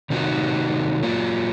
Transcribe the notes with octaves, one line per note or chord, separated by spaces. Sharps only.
C3 D#3 A#3 D#4 F#4
F#3 A#3 F4